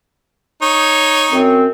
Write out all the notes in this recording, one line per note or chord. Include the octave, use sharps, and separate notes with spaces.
D#4 C#5
F#2 C4